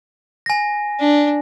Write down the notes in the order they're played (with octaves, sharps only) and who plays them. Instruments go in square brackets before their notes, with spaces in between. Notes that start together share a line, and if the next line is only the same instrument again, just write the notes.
[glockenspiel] G#5 A#6
[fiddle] D4